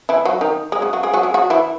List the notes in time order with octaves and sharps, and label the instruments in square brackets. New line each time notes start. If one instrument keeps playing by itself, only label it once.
[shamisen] E3 E4
F#3 F#4
D#3 D#4
G#3 G#4
F#3 F#4
F#3 F#4
G#3 G#4
F#3 F#4
G#3 G#4
F#3 F#4
E3 E4